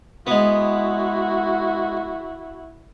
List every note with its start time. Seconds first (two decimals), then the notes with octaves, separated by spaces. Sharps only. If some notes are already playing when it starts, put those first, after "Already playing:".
0.27 G#3 B3 E4 F#4